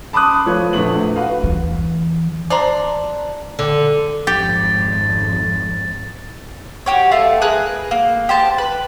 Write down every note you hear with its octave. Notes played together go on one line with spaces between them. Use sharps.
A5 B5 C6 D6 D#6 F#6
F3 A3 F4 B4 C#5
A#1 E2 F3 A3 F#7
F#4 B4 F5
E2 E3
D4 C5 A#5
D3
G#1 F2 G4 A6
F#4 G4 C#5
A3 F4 A5
G#4 A#4 B4 F#6
A#3
G4 C5 A5
B4